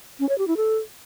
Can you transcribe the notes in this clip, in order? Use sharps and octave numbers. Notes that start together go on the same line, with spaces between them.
C#4
C#5
G4
E4
A4